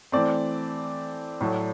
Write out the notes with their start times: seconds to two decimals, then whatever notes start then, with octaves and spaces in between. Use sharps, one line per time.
0.12 E3 A3 C4 D5
1.41 A2 F#3 A3